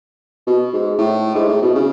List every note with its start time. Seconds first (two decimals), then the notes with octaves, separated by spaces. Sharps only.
0.47 B2
0.73 G#2
0.98 A2
1.35 G#2
1.48 A2
1.62 B2
1.75 C#3